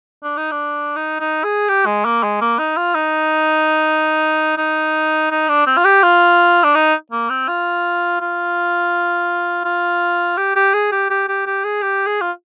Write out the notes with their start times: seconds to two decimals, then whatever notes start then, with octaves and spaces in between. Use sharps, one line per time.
0.23 D4
0.37 D#4
0.51 D4
0.96 D#4
1.20 D#4
1.44 G#4
1.69 G4
1.86 G#3
2.05 A#3
2.23 G#3
2.41 A#3
2.59 D#4
2.77 F4
2.95 D#4
4.58 D#4
5.31 D#4
5.48 D4
5.66 C4
5.77 F4
5.85 G4
6.03 F4
6.64 D4
6.75 D#4
7.12 A#3
7.29 C4
7.48 F4
8.21 F4
9.65 F4
10.37 G4
10.56 G4
10.74 G#4
10.92 G4
11.10 G4
11.28 G4
11.46 G4
11.65 G#4
11.82 G4
12.07 G#4
12.21 F4